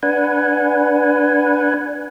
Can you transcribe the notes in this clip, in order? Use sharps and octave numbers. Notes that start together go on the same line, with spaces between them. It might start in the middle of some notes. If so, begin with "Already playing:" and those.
D4 B4 F#5 G#5